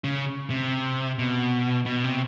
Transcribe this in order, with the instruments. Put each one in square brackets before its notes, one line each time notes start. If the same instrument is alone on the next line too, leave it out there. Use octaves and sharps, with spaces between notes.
[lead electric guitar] C#3
C3
B2
B2
C3